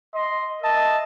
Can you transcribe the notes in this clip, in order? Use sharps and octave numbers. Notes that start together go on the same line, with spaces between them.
D#5 C6
A#4 D#5 E5 A5